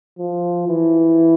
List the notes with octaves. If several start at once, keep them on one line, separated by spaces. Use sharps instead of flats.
F3
E3